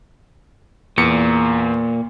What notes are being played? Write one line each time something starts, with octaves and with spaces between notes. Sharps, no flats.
E2 A#2 C#7